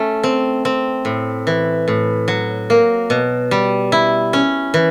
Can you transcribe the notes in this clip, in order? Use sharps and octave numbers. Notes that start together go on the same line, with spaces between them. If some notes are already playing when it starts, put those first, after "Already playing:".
Already playing: A3 C#4
C4
C4
A2
E3
A2
F#3
A#3
B2
G3
E4
C#4
E3